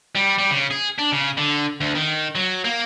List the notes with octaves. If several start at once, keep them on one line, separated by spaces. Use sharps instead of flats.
G3
G3
C#3
G#4
D4
C#3
D3
D2
D#3
F#3
A#3